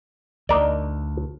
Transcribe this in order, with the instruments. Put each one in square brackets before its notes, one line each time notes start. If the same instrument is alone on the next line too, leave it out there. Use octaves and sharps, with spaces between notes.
[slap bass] D2 [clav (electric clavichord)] D#4 A#4 D5